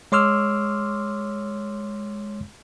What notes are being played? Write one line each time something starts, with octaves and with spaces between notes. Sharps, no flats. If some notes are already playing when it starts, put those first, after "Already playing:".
G#3 C#5 C6 D6 E6 F6